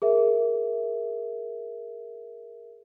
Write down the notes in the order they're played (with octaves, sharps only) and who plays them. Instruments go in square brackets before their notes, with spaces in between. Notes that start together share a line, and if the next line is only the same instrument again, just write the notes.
[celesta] G#4 A#4 E5